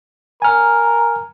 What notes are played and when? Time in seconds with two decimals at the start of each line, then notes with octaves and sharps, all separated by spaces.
0.42 A#4 G#5 F6